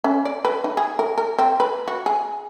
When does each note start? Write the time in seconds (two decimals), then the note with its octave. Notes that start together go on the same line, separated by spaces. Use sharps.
0.04 C#4
0.25 D5
0.45 B4
0.64 D#4
0.77 G#4
0.99 A#4
1.18 A#4
1.39 C4
1.60 B4
1.88 F#4
2.06 G#4